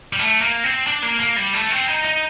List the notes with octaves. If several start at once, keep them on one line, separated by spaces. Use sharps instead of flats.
G3
A3
A#3
C4
D4
A#3
A#3
G3
A3
C4
D#4
D#4